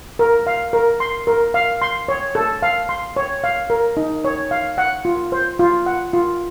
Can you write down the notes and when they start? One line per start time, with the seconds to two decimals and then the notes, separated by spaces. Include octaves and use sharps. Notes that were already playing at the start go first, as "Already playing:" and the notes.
0.19 A#4
0.47 F5
0.73 A#4
1.00 C6
1.27 A#4
1.54 F5
1.82 C6
2.08 C#5
2.35 A4
2.63 F5
2.89 C6
3.16 C#5
3.44 F5
3.70 A#4
3.97 D#4
4.24 C#5
4.51 F5
4.78 F#5
5.05 F4
5.32 C5
5.59 F4
5.86 F#5
6.13 F4